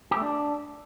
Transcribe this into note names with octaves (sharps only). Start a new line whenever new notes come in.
G4
A3
D4